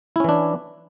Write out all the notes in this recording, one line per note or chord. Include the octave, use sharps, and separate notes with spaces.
E3 C#4 D4 E4